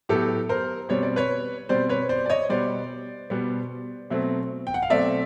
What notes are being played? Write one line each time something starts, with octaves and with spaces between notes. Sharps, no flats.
A2 F#3 B3 G4 A4
A#4 C5
B2 G3 C4 C#5
D5
B4 C#5
B2 G3 C4 C5 D5
B4 C#5
C5 D5
D5
C#5 D#5
B2 G3 B3 C5 D5
B2 G3 B3
B2 F#3 A3 C4
G5
F#5
F5
B2 F#3 A3 C4 D5 E5